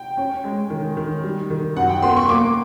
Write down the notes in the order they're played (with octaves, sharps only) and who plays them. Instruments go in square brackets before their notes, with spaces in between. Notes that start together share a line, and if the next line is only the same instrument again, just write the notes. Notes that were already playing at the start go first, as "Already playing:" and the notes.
Already playing: [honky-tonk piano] G5
C#4
G#3
D#3
D#3
G3
D#3
F#2 F#5
G5
B3 C6
C#6
A#3 D6